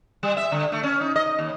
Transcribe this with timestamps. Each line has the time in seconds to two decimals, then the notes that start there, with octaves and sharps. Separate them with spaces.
0.23 G3
0.37 E5
0.52 D3
0.72 A3
0.83 C#4
1.01 D#4
1.16 D#5
1.39 D#2